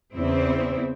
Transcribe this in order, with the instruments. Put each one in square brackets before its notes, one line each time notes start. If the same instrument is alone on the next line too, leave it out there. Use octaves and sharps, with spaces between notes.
[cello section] E2 C#3 C4 E4